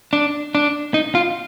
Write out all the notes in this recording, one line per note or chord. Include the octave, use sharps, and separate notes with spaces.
D4
D4
D#4
F4